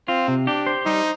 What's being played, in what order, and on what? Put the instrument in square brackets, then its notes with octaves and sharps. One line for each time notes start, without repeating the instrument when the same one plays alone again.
[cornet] C4 [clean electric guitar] F4
[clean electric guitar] C3
[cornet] D4 [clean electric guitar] G4
[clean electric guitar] C5
[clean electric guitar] G3 [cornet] D#4